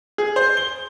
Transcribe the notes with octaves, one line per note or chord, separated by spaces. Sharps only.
G#4
C5
G7